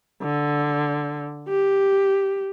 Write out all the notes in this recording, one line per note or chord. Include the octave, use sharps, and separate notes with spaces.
D3
G4